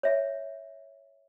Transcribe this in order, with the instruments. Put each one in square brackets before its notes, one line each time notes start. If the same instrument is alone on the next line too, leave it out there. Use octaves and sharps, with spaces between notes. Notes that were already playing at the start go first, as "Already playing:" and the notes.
[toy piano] C#5 E5